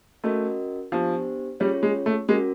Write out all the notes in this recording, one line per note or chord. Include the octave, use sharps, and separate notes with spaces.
A3 C#4 F#4 A#4 D#5
F3 B3 D4 G4 C5
G3 C#4 F4 G#4 C#5
G#3
A3
G#3 C#4 F#4 A#4